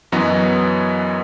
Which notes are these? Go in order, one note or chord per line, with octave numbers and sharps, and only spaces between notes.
F#2 E3 F#3 B3 D#5